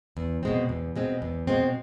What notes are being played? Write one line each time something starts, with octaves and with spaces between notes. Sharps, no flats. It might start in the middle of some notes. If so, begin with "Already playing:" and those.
E2
B2 G#3 C4
E2
B2 G#3 C4
E2
B2 G#3 C4